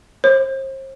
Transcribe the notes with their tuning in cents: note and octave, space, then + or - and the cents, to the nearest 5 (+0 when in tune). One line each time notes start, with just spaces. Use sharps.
C5 +35